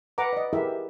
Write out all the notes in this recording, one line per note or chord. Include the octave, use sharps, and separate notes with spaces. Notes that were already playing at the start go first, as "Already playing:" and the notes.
B4 F#5 A#5 D6
D5 D#5
E4 G4 G#4 A#4 B4 E5